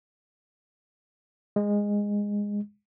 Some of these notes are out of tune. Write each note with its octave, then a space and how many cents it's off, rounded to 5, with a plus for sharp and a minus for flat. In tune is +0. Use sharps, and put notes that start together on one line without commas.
G#3 -15